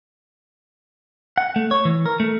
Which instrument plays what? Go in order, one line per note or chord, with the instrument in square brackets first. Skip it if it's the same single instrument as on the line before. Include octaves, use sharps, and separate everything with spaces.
[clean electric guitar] F#5
A3
C#5
E3
A#4
A3